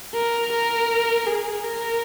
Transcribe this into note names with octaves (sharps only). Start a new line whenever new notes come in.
A#4
A#4
G#4
A#4